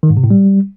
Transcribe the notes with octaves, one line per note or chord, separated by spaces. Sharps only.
D#3
G#2
C3
A2
G3